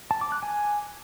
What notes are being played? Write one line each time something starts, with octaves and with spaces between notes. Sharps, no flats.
A5
D6
F#6
G#5